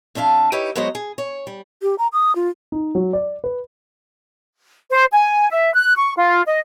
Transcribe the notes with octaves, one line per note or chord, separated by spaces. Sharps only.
F2 D4 E5 F5 A5
D#4 E4 G4 B4 C#5
F#3 G#3 B3 C5 C#5 D#5
G#4
C#5
G3
G4
A#5
D#6
F4
D#4
F#3
D5
B4
C5
G#5
E5
F#6
C#6
F4
D#5